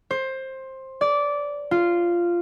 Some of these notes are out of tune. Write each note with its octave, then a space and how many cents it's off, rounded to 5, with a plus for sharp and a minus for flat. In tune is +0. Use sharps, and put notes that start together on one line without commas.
C5 +15
D5 -15
F4 -10